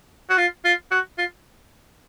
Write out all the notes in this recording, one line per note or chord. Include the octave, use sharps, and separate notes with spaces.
F#4
F4
F4
F#4
F4